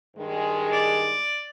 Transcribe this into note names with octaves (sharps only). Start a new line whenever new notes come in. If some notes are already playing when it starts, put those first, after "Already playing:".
G2 D#3 G#3
D5